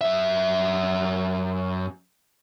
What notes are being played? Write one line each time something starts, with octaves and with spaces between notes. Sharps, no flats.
F#2 E5